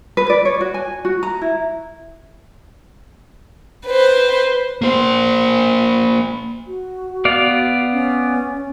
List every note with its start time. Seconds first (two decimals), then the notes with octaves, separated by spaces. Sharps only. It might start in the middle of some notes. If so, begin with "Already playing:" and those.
0.17 B4
0.30 D5
0.45 C#5
0.61 F#4
0.74 G#5
1.05 F#4
1.23 A#5
1.41 E4
3.87 B4 C5
4.82 A#3 C5
6.67 F#4
7.25 B3 D5 F5
7.93 C#4